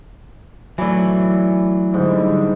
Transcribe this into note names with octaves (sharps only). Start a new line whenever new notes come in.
E3 F#3 A3 D5
G#2 D3 G3